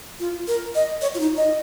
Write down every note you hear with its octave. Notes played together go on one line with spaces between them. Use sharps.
F4
A#4
D#5
C#5
F4
D#4
D#5